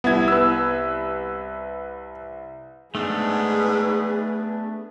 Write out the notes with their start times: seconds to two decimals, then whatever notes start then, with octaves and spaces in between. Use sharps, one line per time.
0.04 C2 B3 E4 G#6
0.28 B4 E6
2.95 G#2 A3 B3 D4 G#4 B4